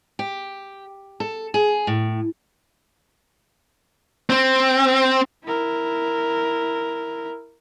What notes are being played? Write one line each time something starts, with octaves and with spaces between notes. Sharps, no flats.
G4
A4
G#4
A2
C4
E4 A#4